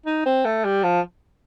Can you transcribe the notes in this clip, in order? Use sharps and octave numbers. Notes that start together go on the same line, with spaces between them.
D#4
C4
A3
G3
F3